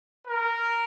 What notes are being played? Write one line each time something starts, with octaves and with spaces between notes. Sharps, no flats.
A#4